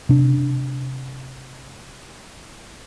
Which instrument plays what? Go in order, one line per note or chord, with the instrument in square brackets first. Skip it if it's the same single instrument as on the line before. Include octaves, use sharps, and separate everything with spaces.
[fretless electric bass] C3 D4